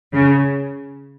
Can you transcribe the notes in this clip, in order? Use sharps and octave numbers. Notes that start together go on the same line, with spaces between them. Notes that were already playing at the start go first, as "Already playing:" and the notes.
C#3